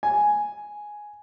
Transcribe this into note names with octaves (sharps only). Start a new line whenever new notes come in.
G#5